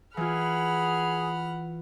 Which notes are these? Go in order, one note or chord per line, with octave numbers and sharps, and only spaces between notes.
E3 F4 G#4 F#5 B5 F6